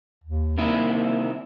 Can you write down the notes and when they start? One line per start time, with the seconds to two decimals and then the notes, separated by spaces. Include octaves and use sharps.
0.24 D#2
0.58 C3 D#3 A#3 E4